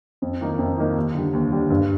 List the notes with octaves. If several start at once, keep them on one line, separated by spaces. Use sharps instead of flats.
F2
D#3 A#3 D#4
F2
D#3 A#3 D#4
D#2
D3 G3
D#2
D3 G3
G2